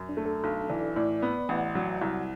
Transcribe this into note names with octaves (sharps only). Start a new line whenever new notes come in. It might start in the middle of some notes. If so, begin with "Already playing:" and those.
Already playing: F#2
D4
A3
A4
B1
E3 D5
A2 D5
B3
A1 F#5
F#3
C2